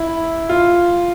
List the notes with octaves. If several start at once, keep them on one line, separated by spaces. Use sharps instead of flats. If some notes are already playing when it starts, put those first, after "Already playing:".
Already playing: E4
F4